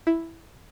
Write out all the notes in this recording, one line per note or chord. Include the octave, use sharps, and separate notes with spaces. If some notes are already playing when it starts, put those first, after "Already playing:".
E4